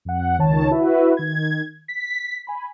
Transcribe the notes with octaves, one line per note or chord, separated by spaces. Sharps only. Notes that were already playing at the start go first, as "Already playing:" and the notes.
F2 F#5
C#2 D#3 C#5 A5
E4 F#4 B4 E5
D#3 G#6
B6
G#5 B5